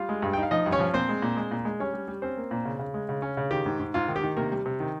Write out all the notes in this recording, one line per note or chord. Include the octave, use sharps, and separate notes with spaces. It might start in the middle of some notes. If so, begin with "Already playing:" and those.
Already playing: G3 F4 F5
G#3
G2
D#4 G5
F5
F3 D#4 D#5
G2
C#4 C#5
F3
A#2 C4 C5
G#3
A#2
G#3
A#2
G#3
G3 C#4 C#5
G3
G3
C4 C#4 C5
A#3
A#2
C#3
C#3
G#3
C#3
C#4
C#3
D#3 G4
G#2
G#2
G#2 F4
D#3
G4
D#3
C3 A#3 A#4
G3
C3
D#3